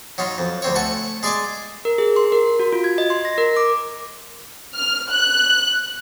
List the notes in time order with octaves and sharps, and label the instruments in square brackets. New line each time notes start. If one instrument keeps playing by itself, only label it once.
[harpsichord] F#3 D#4 F4
F2
D2 C4 C#5
A3 F#5 G#5
G#3 G#4 D5 D#5 G#5 D6
[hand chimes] A#4
G#4
C6
A#4
F#4
F4
G#6
D#5
C6
A#6
A#4
D6
[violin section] F6
F#6